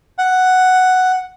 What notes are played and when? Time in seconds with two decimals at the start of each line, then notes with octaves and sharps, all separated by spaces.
0.18 F#5